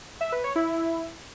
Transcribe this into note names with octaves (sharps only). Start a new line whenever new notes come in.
E5
B4
C#5
E4